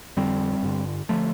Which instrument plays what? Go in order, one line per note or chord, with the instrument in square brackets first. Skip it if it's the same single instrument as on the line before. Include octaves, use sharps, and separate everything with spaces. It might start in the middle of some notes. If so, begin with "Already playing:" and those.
[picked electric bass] F2 D3 G3 C4
G2 D3
D3 F3 A3